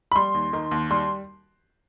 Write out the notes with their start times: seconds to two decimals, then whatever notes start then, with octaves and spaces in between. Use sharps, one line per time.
0.12 B5
0.16 G3 C6
0.34 D#2
0.53 D#3
0.71 D#2
0.90 G3 C6